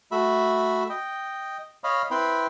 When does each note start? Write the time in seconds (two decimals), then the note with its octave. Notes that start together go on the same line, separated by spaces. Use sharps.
0.12 A3 F#4 E5 B5
0.90 D#5 G5
1.84 C#5 D#5 F5 B5
2.11 C4 E4 B4 G5 B5 C6